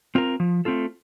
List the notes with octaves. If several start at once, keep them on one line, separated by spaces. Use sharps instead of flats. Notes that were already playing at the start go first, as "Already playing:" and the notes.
C4 F4 A#4
F3
A3 C4 F4 A4